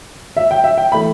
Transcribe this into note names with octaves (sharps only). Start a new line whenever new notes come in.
E5
G5
E5
G5
E3 A3 B5